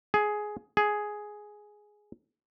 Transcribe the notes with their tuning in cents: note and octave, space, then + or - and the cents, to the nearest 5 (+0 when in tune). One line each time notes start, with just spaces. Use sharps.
G#4 +10
G#4 +5